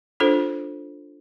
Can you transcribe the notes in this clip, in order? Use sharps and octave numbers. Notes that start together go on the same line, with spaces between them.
D4 F4 A4 C5